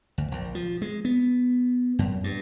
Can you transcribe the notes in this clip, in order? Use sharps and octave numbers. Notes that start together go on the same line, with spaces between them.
D2
A#1
F3
G#3
B3
F#2
G2